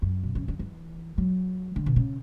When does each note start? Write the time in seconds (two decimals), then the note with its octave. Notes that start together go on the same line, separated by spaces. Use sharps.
0.02 F#2
0.23 B2
0.35 C#3
0.48 D3
0.59 E3
1.18 F#3
1.76 D3
1.86 B2
1.96 C#3